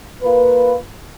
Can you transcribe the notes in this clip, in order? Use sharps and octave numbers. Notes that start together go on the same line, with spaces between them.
A#3 F4 B4